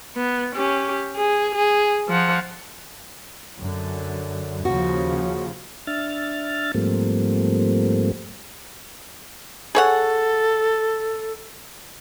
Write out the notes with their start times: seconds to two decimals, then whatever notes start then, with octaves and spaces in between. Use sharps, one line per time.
0.16 B3
0.55 C#4 G4
1.16 G#4
1.55 G#4
2.08 F3 F#5
3.58 F#2 D3
4.65 D#2 C#3 F3 F#4
5.87 D4 E5 F6 A6
6.74 G#2 F3 G3 A3 A#3 C4
9.75 G#4 A4 C#5 F#5